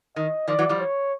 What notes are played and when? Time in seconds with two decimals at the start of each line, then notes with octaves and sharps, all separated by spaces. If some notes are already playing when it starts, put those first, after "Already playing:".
0.16 D#3 D#5
0.48 D#3 F3 D5
0.59 E3 F#3
0.69 F3 G3
0.80 C#5